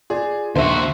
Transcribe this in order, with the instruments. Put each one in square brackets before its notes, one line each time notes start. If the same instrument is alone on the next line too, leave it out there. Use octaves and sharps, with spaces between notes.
[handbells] F4 D5 [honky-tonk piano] G#4
[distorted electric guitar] D#2 F#4 [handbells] D4 [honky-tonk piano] C5 E5